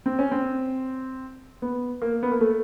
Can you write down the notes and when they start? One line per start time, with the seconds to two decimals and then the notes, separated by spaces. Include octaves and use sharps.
0.06 C4
0.19 C#4
0.32 C4
1.62 B3
2.02 A#3
2.23 B3
2.32 A#3
2.41 A3